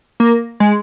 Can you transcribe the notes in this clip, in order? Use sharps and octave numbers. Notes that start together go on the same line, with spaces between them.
A#3
G#3